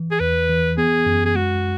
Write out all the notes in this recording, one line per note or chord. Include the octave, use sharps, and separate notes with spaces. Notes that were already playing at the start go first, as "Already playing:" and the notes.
Already playing: E3
G#4
E2 B4
E3
B3 G#4
F#2
G#4
G#3 F#4